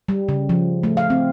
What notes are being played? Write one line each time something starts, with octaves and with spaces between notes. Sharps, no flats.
G3
C#3
F3
A3
F5
C4